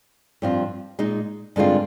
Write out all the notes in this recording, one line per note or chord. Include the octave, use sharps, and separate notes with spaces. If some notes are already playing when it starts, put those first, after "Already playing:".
G2 F3 C4 F4
A#2 G#3 D#4
G2 D3 G#3 C4 F4